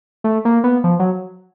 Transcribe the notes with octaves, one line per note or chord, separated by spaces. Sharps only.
A3
A#3
B3
F3
F#3